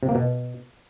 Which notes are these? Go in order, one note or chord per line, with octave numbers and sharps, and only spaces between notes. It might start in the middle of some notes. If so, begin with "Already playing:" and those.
C3
A#3
B2